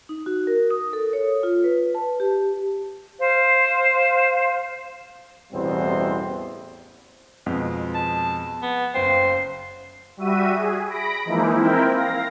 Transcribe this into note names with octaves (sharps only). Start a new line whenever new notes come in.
D#4
F#4
A#4
D#6
A4
C#5
F4
B4
A5
G4
C5 F5
A1 E2 B2 G3 C4 C5
F2 B2 G#3
A5
B3
F#1 C5 F5 G5
G3 F#4 E5 D#7
G#4
B5 A#6 D7
E3 F3 G#3 A#3 D#4 E4
C4 E4 A#4 G5
F5 A#6